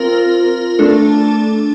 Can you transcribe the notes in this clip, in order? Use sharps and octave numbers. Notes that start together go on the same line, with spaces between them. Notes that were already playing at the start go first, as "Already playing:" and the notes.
Already playing: C4 F4 A#4
A3 D4 A4